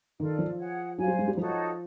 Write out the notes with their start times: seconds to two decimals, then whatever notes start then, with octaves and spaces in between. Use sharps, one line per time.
0.19 D#3 F4 A4 D5
0.39 F3
0.58 G#4 C#5 F#5
0.98 F#3 C5 F5 G#5
1.08 G3
1.18 G#3
1.28 G3
1.37 F3 D#4 F#4 A4 C#5